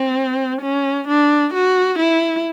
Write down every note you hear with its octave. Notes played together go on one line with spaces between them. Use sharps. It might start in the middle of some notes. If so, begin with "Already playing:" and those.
Already playing: C4
C#4
D4
F#4
E4